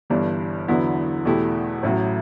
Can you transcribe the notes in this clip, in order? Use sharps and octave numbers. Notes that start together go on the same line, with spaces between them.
G1 G2 E3 G3 D4
E2 D3 F#3 B3 E4
E2 B2 A3 E4 G4
A1 A2 F#3